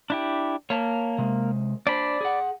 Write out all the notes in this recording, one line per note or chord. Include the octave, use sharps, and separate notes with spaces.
D4 E4 G4
A#3 C#5 A5
C3 G#3
D4 C5 D5 B5
G#4 F#5